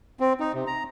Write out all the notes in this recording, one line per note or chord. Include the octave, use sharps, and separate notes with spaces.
C4
D#4
C3
A#5